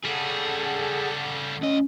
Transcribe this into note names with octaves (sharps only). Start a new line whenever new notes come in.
C#3 G3 G#4 A4 F#5
D2 C#4 D#5